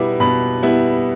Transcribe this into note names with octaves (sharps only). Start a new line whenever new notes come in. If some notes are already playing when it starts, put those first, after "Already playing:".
Already playing: B2 G3 B3 E4 D6
B2 B5
G3 B3 E4